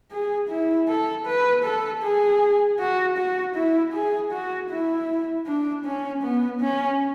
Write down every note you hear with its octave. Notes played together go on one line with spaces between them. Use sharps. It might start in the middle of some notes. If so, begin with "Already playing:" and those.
G#4
E4
A4
B4
A4
G#4
F#4
F#4
E4
G#4
F#4
E4
D4
C#4
B3
C#4